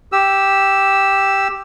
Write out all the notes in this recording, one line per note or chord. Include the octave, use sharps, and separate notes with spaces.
G4 E6